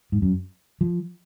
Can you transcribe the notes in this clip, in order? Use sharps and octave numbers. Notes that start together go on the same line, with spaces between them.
G#2
F#2
F3